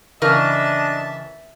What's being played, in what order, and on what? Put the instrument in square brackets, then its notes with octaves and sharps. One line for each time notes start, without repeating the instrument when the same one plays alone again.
[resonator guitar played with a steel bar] C#3 E3 A#4 [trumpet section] D4 D#5 [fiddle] E5 A5